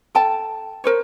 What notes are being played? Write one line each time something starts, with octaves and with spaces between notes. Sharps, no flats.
A4 G5 A5
A#4 C5 C#5